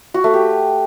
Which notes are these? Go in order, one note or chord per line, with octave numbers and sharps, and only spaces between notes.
F#4
A3
G4